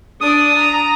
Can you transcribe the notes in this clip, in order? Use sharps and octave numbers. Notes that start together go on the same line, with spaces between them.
D4 D5 D#6
A#5